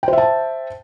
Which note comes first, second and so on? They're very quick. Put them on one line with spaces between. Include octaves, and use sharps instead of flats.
G5 C5 E5 A5